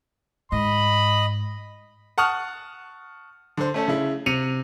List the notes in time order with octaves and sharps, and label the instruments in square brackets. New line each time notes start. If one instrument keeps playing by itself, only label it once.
[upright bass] G#2 [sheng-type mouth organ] D#5 [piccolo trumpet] B5
[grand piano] F#5 A5 C#6 D#6 F6 F#6
D3 C5
A3 C#4 A4
C#3 E4
C3 C#7 D#7 F7